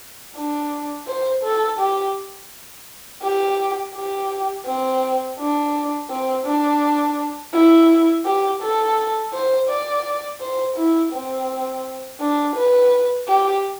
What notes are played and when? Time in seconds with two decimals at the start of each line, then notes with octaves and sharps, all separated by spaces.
0.36 D4
1.07 C5
1.43 A4
1.79 G4
3.23 G4
3.95 G4
4.66 C4
5.39 D4
6.10 C4
6.46 D4
7.54 E4
8.25 G4
8.62 A4
9.33 C5
9.69 D5
10.41 C5
10.76 E4
11.13 C4
12.20 D4
12.56 B4
13.27 G4